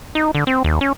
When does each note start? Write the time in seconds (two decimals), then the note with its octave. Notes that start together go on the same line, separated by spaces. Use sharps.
0.15 D#4
0.35 D3
0.47 C4
0.64 D#2
0.81 C#4